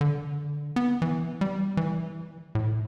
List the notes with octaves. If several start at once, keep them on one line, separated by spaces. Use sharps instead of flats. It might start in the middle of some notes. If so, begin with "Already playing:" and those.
D3
B3
E3
G3
E3
A2